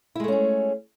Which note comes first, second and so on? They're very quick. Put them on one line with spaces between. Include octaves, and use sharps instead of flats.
E4 G#3 A3 C#4 G#4